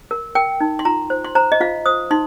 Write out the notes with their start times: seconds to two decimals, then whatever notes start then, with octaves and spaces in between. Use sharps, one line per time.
0.11 A#4
0.35 A#4 G5
0.61 D#4
0.79 C6
0.85 F4 A#5
1.10 C5
1.24 C6
1.35 C5 A#5
1.52 D#5
1.60 F4 F5
1.86 C5 D#6
2.11 D#4 C6